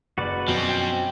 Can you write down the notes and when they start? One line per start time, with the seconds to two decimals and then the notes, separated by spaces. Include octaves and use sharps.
0.18 F#1 F#4 B4 D5
0.48 F#2 B2 F3 C4
0.69 G5